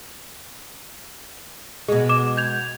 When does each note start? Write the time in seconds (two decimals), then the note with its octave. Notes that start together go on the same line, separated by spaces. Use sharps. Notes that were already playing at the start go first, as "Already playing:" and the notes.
1.88 B2 G#3 G#4
2.09 D6 E7
2.37 G6 G#6 F7